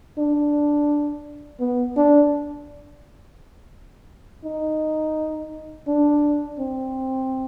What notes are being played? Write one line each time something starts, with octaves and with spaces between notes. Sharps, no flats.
D4
B3
D4
D#4
D4
C4